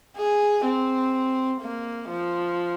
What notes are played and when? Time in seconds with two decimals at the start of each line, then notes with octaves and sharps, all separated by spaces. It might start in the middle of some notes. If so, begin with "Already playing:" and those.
0.16 G#4
0.65 C4
1.61 A#3
2.09 F3